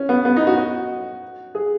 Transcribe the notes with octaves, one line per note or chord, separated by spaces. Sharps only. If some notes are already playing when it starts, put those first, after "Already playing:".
Already playing: C#4
B3
B3
D#4
F#4
F#4
G#4